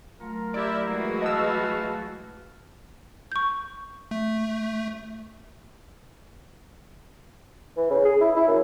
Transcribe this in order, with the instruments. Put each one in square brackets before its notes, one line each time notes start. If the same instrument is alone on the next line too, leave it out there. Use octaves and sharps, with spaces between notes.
[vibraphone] F#3 A3 [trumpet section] F4 A#4
[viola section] E4 G4 E5 [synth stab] D5
[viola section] E3 G#3 F#4 [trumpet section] A#3 B3 E4
[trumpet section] B4 F5 A5 [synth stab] D#5 E6
[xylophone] C#6 G6
[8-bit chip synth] A3
[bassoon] E3
C#3
G#4
E4
E4
F#2